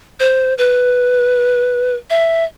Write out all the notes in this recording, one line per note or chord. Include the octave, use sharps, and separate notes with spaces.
C5
B4
E5